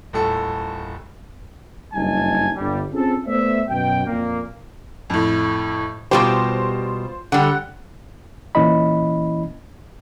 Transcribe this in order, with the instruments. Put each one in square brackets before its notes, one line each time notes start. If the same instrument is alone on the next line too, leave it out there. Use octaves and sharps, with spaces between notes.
[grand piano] D#1 A2 A4
[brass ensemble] F#1 G2 G3 D#4 G#5 A5
G1 G3
C4 C#4 F4 G#4 A4
A3 B3 C5 D5 E5
F#2 B2 G5
F2 A#2 A#3
[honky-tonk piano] F2 A2
[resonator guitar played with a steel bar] B2 G3 G4 [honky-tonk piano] F4 C5
[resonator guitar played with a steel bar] D3 G3 [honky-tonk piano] F#5
[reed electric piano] A#2 E3 C#4 E4 D#5 B5